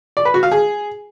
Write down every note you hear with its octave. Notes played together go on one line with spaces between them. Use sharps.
D5
B4
F#4
F5
G#4